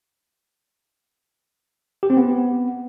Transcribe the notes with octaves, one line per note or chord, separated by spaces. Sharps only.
G4
C4
B3